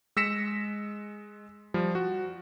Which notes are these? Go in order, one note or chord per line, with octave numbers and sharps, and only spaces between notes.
G#3 E6 A#6 B6 C#7 E7
F3 G3
F#4